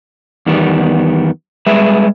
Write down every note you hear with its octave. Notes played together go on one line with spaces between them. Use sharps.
E2 D#3 G3 B3
G3 G#3 G#4 B4 E5